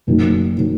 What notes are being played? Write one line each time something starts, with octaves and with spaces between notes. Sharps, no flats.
F#1 F#2 D#3 F#3
D#3 F#3